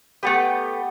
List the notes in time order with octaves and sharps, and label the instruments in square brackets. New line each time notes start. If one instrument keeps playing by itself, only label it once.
[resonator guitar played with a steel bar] A3 A4 B4 [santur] B3 G4